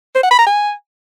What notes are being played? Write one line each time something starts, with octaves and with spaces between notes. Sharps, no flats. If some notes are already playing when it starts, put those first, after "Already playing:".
C5
F#5
B5
A#5
G#5